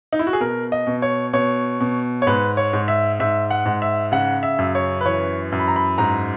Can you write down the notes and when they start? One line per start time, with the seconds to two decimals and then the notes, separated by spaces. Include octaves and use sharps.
0.13 D#4
0.19 E4
0.27 F#4
0.33 G#4
0.41 B2 A#4
0.72 D#5
0.87 B2
1.02 C#5
1.33 B2 C#5
1.81 B2
2.22 C#5
2.27 G#2 B4
2.57 C#5
2.73 G#2
2.88 E5
3.20 G#2 E5
3.51 F#5
3.66 G#2
3.82 E5
4.12 C#3 F#5
4.43 E5
4.59 F#2
4.75 C#5
5.01 B4
5.05 E3 C#5
5.52 F#2
5.60 B5
5.68 A#5
5.76 B5
5.98 G#2 A#5